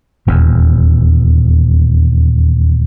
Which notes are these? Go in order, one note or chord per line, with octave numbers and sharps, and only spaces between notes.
D#1 E2